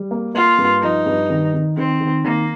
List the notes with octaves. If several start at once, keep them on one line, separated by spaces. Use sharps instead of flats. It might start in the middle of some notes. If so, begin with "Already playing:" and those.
Already playing: G3
A#3
A#3 F4
G2
F3 D#4
G2
D#3
D#3
D#3 C4
D#3
D#3 A#3